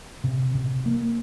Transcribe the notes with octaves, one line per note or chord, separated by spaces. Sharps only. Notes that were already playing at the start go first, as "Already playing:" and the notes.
C3
C3
A#3